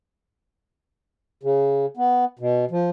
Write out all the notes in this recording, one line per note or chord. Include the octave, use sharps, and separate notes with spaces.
C#3
B3
B2
F3